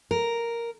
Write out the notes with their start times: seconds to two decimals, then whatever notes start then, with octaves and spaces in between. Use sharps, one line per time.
0.11 A#4